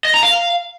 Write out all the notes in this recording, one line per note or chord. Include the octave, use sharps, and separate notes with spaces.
D#5
A#5
F5